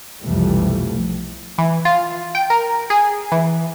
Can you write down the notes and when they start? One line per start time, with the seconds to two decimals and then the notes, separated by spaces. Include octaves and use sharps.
0.23 B1 F2 C3 E3 G3 A3
1.58 E3
1.85 F4
2.35 G5
2.50 A#4
2.90 G#4
3.32 E3